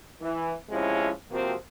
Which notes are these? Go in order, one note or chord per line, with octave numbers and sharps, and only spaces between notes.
E3
C3 F3 G#3 C#4 E4
C3 F3 A#3 C4 F#4